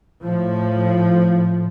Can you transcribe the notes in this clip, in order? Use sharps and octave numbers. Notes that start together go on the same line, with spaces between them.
A2 F3